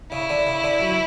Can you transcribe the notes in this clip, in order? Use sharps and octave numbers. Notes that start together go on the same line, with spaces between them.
C#3 E4
D3
C#3
D3
F#3